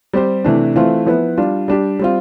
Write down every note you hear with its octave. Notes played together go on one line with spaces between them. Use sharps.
G3 C4 G4 C5
C3 E3 A3 D4
E3 A3 C4 F4
F3 B3 E4 B4
G3 D4 F4
G3 D4 G4
G3 C4 F4